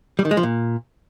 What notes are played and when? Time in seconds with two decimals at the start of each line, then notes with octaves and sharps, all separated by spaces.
0.19 G3
0.25 D#3
0.31 G#3
0.37 F3
0.43 A#2